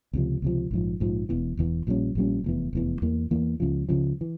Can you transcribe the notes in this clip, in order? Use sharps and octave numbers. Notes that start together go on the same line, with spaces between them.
C#2 C3 F3
C#2 C3 F3
A#1 G#2 F3
A#1 G#2 F3
E1 E2 E3
E1 E2 E3
A#1 A#2 G3 C#4
A#1 A#2 G3 C#4
F1 E2 E3
F1 E2 E3
E2 E3 A#3
E2 E3 A#3
C#2 C#3 F3
C#2 C#3 F3
E3